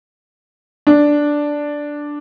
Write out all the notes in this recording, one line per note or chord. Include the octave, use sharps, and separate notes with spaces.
D4